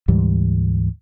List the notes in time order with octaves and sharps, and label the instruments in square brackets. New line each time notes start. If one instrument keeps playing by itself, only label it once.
[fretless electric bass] D2 G#2 E3 G3